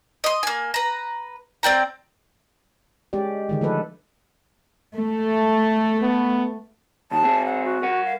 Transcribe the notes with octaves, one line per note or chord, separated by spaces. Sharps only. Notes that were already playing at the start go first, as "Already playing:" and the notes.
D#5 C6
A#3 G#5
B4 A#5
C4 D5 G5 A#5
G#3 C#4 G4 D5
D3 D#3 G#3
F3 A3 A4 B4
A3 A4
B3
D#2 D#3 A5
C4 G#4
F#5
F#4
A#4 F#5
F5